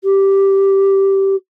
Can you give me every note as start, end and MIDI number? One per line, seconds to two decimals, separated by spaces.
0.04 1.35 67